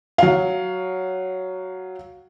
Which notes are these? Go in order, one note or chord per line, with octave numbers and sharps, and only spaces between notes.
F#3 F5